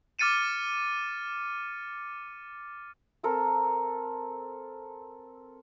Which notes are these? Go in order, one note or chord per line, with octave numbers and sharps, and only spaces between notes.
D6 F6 A6 C#7 D#7 E7
C4 A4 A#4